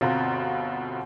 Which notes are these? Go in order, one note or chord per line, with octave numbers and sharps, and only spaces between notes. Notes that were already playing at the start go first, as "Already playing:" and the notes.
G1 B2 C4 F4 A#5